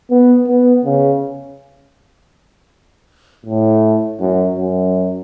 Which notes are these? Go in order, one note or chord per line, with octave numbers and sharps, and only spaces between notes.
B3
B3
C#3
A2
F#2
F#2